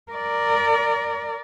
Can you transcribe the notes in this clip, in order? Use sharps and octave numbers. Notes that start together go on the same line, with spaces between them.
A#4 D5